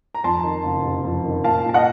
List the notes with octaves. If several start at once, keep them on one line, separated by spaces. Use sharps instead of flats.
A#5
F2 A5 C6
D#3
F#1
C3
F2
D#3
A#2 F5 A5
A#2 A5
D#5 F#5